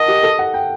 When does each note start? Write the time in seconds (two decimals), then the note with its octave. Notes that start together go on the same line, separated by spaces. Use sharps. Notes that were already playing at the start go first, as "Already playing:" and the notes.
Already playing: A#4 D#5 F#5 A5
0.08 G4
0.23 A4
0.39 F#5
0.54 G5